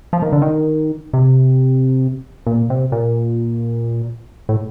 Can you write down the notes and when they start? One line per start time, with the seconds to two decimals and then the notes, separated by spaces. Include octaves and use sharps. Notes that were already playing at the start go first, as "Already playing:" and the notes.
0.13 F3
0.22 D#3
0.32 D3
0.42 D#3
1.13 C3
2.47 A#2
2.70 C3
2.92 A#2
4.49 A2